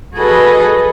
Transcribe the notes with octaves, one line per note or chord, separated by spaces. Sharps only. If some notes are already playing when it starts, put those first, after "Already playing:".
F#4 G#4 A4 B4 D#5 B5